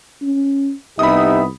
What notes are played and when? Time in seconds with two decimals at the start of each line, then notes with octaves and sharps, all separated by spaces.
0.22 C#4
0.99 C2 B3 D#4 G4 E5 B5 D#6